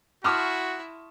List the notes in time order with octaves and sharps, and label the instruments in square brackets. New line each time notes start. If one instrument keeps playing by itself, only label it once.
[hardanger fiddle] E4 [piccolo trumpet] F#4 [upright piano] A5 C#6 D#6 [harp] C6 F6